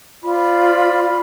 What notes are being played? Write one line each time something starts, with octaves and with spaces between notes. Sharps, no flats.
F4 C5 D5 B5